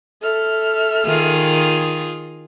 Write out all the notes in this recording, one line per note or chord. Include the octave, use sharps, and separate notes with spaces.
A4 E5 F6
D#3 F4 G#4